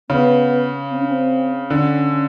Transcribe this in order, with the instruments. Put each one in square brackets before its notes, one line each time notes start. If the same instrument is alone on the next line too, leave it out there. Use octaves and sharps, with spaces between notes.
[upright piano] C#3 [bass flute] B3
[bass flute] C4
C#4
C4
[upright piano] D3 [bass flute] C#4